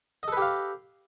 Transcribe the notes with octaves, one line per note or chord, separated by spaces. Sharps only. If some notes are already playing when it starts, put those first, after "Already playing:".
G4 A4 B4 D#5 F5